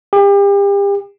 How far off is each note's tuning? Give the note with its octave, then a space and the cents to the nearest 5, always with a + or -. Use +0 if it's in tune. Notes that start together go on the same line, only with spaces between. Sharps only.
G4 +35